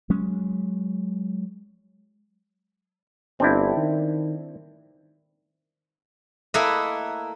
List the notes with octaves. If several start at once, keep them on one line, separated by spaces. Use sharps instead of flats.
F#3 G#3 C#4
G1 C4 D4 E4
D#3
A3 A#3 E4 B4 D#5